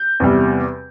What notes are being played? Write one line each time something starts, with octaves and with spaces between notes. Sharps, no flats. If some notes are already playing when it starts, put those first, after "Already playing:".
Already playing: G6
E2 C3 G3